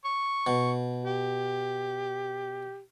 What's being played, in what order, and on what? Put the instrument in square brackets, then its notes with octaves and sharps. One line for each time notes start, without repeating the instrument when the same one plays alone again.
[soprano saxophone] C#6
[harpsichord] B2
[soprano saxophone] G4